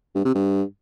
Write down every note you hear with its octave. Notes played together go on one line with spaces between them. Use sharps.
G2
C3
G2